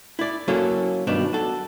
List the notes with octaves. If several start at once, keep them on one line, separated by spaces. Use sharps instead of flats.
E4 D5
F#3 A#3 C#4 E4 A4
G2 B2 D#3 D4
F#4 A4